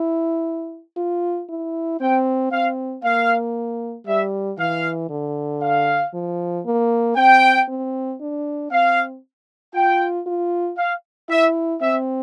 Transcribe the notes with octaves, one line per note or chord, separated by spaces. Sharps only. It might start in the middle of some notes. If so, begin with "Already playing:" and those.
Already playing: E4
F4
E4
C4 G5
C4 F5
A#3 F5
G3 E5
E3 F5
D3
F5
F3
A#3
C4 G5
C4
D4
C4 F5
F4 G5
F4
F5
E4 E5
C4 E5